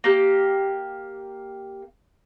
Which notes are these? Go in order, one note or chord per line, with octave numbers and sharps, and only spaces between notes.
A#3 G4